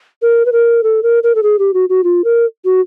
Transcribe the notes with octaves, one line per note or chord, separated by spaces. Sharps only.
A#4
B4
A#4
A4
A#4
A#4
A4
G#4
G4
F#4
F#4
F4
A#4
F#4